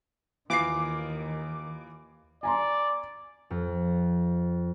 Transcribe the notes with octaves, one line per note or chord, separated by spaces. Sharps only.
D#2 D#3 E3 F4 D6 C7
D5 G#5 A#5 C6
F2